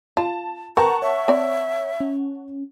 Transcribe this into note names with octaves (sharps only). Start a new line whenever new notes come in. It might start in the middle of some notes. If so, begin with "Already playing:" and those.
F4 A5
A#4 B4 F#5 G5 A5 A#5 C#6
C#5 E5
C4 D5
C#4